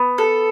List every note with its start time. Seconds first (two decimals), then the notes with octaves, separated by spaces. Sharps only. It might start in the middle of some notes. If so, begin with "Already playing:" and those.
Already playing: B3
0.18 A4